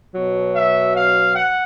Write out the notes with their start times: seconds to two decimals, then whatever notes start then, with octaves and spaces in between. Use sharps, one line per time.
0.14 B2 F#3
0.54 E5
0.94 F5
1.35 F#5